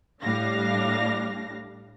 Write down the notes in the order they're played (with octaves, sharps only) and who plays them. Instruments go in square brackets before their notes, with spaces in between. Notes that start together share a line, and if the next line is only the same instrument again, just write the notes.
[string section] A2 G3 D4 F5 A#6